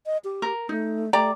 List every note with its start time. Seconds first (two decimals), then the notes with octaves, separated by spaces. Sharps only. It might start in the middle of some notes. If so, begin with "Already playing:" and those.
0.06 D#5
0.24 G4
0.42 A#4
0.69 A3 D#4
1.13 A3 G4 D5 A#5